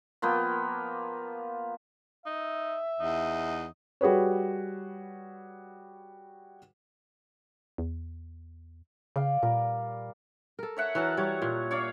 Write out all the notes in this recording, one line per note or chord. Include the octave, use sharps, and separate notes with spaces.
F3 A#3 B3 G5
D#4 E5
E2 D#4
G3 F#4 G#4 B4 C#5
E2
C#3 D5 F5 G5
A#2 G3 A#4
A4 A#4
C#5 E5 F#5
E3 F#3 A#4 A5
G3 C#5
A#2
C#5 D5 F5